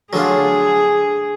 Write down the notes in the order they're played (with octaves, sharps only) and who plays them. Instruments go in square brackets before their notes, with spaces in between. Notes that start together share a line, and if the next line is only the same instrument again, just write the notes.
[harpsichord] D3 F#3 A3 D4 F4 [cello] G#4